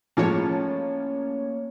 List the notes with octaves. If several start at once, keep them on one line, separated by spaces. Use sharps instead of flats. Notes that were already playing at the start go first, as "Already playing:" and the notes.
A2 F3 G#3 A#3 C#4 C#5